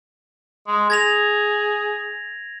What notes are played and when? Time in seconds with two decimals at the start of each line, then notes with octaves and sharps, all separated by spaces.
0.68 G#3
0.90 G#4 G#6 A#6 F7